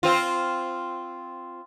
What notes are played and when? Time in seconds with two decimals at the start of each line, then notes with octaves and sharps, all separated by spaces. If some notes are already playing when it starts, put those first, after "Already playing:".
0.03 C4 F4